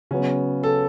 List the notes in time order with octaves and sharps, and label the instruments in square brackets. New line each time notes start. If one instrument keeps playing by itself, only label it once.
[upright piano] C#3 F#3 B3 [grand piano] C#4
[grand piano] A4